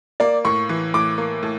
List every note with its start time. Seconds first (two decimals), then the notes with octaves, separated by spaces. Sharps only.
0.20 A#3 D5
0.45 A2 C#6
0.69 E3
0.94 A2 D6
1.18 A#3
1.43 A2